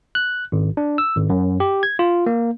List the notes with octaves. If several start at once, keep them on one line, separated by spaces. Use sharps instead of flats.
F#6
G#1
D4
E6
G#1
F#2
G4
G#6
F4
A#3